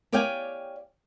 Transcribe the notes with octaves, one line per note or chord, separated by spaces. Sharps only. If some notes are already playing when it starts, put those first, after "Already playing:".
G4 C#5 D5 F5 G5 G#5